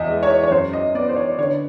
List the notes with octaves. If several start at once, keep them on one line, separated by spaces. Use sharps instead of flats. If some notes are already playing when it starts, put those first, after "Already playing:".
Already playing: E2 D#5 E5
G#3
C#5
C#5
F#2 C5
D#5
B3 D5
C5
C#5
D3 C#5